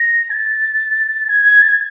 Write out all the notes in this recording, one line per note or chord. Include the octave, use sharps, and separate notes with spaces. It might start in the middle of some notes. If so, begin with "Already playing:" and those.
Already playing: A#6
G#6
A6
G#6
A6
G#6